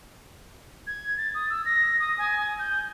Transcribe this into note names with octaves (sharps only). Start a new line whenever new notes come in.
G#6
A6
D#6
E6
A#6
D#6
G#5
G6